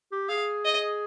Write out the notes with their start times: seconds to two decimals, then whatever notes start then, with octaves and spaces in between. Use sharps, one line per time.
0.12 G4
0.29 G#4 F5
0.65 D#5